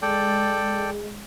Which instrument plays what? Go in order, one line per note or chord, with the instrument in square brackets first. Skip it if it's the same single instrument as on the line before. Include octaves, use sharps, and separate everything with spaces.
[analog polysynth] G#3 [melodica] A4 D5 G5